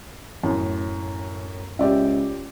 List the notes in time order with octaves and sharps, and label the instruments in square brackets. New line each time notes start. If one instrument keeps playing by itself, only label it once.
[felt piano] F#2 A2
[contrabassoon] C#2 [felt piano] G4 D5 E5